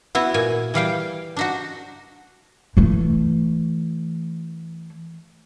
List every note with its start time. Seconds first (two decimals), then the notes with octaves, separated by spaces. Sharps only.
0.15 B3 E4 F#4
0.34 A#2 G#5
0.74 E3 G3 F5 G5
1.37 D4 D#4 F#4
2.77 E3 A3